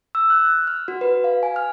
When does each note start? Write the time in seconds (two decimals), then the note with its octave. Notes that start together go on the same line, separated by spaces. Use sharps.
0.15 E6
0.30 F#6
0.67 F6
0.88 F#4
1.01 B4
1.24 F5
1.43 G#5
1.56 F6